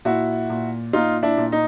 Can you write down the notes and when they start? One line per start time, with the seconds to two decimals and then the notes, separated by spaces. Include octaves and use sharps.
0.05 A#2 E4 F#4
0.50 A#2
0.93 A#2 D#4 F4
1.23 D4 E4
1.38 A#2
1.52 D#4